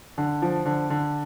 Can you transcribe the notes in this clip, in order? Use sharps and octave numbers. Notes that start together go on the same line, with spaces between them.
D3
F3
D3
D3